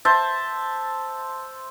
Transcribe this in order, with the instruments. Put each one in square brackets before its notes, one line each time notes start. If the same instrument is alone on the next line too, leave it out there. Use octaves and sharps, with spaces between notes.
[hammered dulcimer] C5 E5 A5